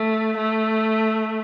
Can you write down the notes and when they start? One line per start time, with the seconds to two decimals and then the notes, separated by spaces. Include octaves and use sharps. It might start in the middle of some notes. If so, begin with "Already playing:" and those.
Already playing: A3
0.37 A3